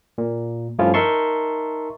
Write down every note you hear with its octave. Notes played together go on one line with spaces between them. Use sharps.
A#2
G2 F3 A3 C#4 E4 F4
D#4 A#4 E5 A5 C6 C#6